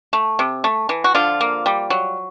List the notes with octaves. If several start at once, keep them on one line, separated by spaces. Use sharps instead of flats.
A3
C3
A3
E3
F#4
D3 F3 F4
A#3
G3
F#3